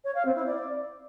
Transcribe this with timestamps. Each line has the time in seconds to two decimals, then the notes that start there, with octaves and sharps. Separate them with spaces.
0.04 C#5
0.15 F5
0.25 C4
0.36 E4
0.46 D5